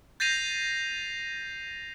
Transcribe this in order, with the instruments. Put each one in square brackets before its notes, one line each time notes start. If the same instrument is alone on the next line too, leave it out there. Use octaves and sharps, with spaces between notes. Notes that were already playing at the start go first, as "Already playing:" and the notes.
[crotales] G6 A6 A#6 C7 D#7 F7